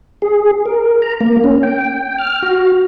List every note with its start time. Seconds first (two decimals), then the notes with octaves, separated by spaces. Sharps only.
0.22 G#4
0.66 A#4
1.02 A#5
1.21 A#3
1.44 C#4
1.63 G5
2.18 F6
2.42 F#4